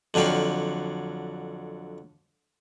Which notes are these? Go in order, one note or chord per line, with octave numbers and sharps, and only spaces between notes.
F2 D3 F#3 F5 G5